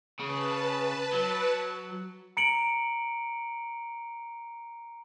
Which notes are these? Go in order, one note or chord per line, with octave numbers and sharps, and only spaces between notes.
C#3 B4 A5
F#3
A#5 C#7 D7 F#7